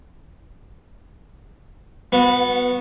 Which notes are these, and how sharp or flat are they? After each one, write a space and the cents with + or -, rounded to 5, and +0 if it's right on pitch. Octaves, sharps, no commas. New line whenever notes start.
B3 +0 F#4 -30